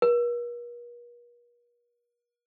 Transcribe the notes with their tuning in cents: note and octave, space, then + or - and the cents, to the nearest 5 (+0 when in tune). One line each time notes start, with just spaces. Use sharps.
A#4 +45